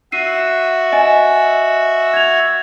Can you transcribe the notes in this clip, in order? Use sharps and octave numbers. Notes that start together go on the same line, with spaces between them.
F#4 E5 C7 D#7
D#5 G#5
G#6 F7